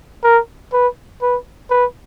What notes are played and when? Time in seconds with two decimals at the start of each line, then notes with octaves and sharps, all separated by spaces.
0.24 A#4
0.73 B4
1.22 B4
1.70 B4